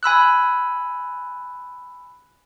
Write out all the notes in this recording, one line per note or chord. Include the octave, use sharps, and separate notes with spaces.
G#5 B5 E6 F#6